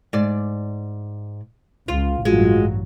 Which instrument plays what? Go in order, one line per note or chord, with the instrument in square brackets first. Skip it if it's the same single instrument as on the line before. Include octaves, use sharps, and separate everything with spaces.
[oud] G#2 D5
[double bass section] C#2 [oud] F4
[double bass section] A1 G2 F#3 [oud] G#3 [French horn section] F4 F#4